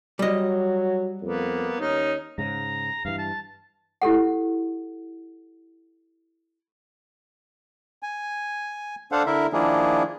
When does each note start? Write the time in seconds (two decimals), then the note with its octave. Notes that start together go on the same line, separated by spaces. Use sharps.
0.19 F#3 G3 D#5
1.22 F2 A#3 B3
1.80 D#2 C#4 D#4
2.38 G#2 C#3 A#5
3.05 G2 E3 F5
3.18 A5
4.02 E4 G4 A4 F#5
8.03 G#5
9.12 D4 A4 C5 F5 F#5
9.27 D3 E4 A#4 E5
9.53 D#3 F3 A#3 D4 E4 G#4